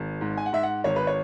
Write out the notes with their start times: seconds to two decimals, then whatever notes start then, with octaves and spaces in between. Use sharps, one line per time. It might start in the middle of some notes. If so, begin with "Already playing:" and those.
Already playing: G#1
0.21 G#2
0.37 G#5
0.46 F#5
0.53 G#2 E5
0.63 F#5
0.84 G#1 C#5
0.96 B4
1.07 C#5